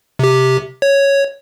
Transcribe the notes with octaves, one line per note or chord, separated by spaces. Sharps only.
C3 G4
C#5